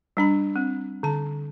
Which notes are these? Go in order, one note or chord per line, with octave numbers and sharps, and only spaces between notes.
G3 D4 B5
C4
D3 A5